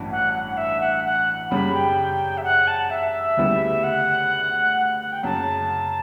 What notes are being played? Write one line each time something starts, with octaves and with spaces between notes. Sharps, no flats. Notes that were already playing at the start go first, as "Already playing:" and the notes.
Already playing: A1 G2 F#3 C#4 E4
F#5
F#5
F#5
E5
F#5
F#5
F#2 C#3 G3 B5
G5
E5
F#5
A5
E5
D2 C#3 G3 B3 E4
F#5
F#5
F#5
G5
F#2 C#3 F#3 A5